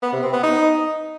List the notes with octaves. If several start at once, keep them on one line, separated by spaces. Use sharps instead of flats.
B3
C3
C4
B3
D#4